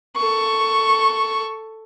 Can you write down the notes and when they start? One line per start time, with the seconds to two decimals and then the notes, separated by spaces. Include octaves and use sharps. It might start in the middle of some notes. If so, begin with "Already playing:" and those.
0.17 A4 C#6